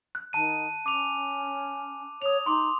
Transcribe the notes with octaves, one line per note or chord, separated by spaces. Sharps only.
F#6
D#3 A5 D#7
C#4 D6 D#7 F7
C#5 D#6 F7
D#4 C6 D6